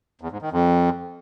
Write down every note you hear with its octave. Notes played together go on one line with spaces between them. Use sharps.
E2
G#2
D#3
F2